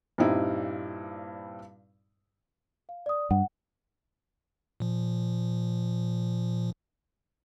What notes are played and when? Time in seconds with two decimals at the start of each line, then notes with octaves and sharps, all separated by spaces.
0.18 G2 A#2 G3 C4 D#4 E4
2.89 F5
3.06 D5 D#6
3.31 G2 F#5
4.80 A#2 F3